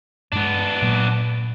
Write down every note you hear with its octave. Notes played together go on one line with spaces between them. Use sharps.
G2 G#3 B3 D4
A#2 F#3 A#3